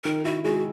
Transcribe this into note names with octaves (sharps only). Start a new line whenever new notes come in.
D#3 A#4
E4 F#4
G#3 F#4